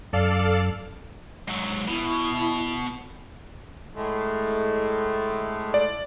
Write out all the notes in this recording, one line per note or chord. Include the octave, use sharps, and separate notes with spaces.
F#2 A4 D5 F5
G#2 F#3
B2 E4
A2 G#3 A3
D5